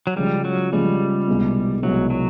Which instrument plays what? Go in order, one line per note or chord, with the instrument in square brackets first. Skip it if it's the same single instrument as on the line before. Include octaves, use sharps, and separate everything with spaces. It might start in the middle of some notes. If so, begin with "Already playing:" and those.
[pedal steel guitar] F#3
[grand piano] C#3 F3 G#3 [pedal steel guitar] G3
[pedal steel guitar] F#3
[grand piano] C#3 F3 G#3 [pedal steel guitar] G3
[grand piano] C2 B2 G#3
[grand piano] C2 B2 G#3 [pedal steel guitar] F#3
[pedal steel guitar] F#3